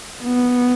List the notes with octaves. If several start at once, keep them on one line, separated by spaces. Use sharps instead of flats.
B3